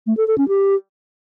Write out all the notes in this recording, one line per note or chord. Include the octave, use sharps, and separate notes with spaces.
A3
A4
A4
C#4
G4